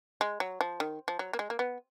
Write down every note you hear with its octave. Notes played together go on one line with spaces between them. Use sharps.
G#3
F#3
F3
D#3
F3
F#3
A#3
G#3
A#3
B3